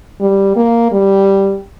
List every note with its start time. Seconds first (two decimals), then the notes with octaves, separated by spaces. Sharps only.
0.21 G3
0.56 A#3
0.92 G3